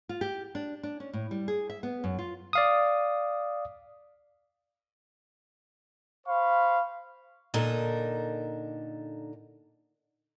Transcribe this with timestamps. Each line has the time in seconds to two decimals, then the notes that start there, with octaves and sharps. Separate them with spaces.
0.09 F4
0.21 G4
0.55 D4
0.83 D4
1.00 C#4
1.13 A2
1.31 G3
1.48 G#4
1.70 E5
1.83 B3
2.04 F#2
2.19 F4
2.53 D5 F5 D#6
6.27 C5 F5 B5 C#6
7.54 A#2 D3 D#4 A4 A#4